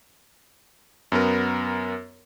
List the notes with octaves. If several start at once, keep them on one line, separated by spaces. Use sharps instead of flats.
F#2 B3 A#4